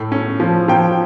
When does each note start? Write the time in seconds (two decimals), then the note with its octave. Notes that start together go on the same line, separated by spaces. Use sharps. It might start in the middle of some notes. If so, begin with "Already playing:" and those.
Already playing: A2
0.12 C#4
0.40 F3
0.68 F3 G5